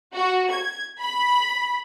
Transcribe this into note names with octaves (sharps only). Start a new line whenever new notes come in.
F#4
G#6
B5